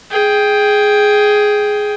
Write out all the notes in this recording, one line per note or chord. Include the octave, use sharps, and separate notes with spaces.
G#4 G5